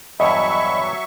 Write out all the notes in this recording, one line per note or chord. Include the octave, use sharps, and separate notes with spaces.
E2 G2 F#3 D#5 E5 B5 C#6